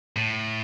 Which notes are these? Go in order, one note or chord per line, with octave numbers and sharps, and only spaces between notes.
A2